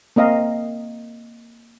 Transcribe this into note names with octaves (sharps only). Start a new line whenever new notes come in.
A#3 C4 D#5 F5 A#5